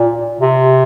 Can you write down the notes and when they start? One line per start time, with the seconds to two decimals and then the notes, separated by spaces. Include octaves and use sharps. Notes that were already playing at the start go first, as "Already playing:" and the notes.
Already playing: A#2
0.41 C3